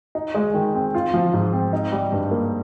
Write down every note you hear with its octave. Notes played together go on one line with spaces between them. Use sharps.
D#4
G#3
D#3
C4
F4
F3
G#2
C4
D#4
G3
G2
A#3